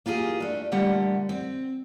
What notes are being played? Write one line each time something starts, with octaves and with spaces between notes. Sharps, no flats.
A#3 F4 G4 G#4
A3 D4
A#2 D3 G3 A3 G4 F#5
C4